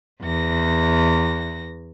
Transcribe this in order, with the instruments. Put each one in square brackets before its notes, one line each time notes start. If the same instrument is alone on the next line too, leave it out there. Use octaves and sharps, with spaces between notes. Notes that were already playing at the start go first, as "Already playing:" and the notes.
[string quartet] E2 A#6